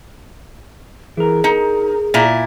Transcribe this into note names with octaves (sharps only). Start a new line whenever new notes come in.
E3 G#4 A#4
D#4 A#4
A#2 E4 A#5